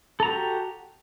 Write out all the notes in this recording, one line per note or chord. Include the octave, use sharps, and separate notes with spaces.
F#4 G4 A4 A#5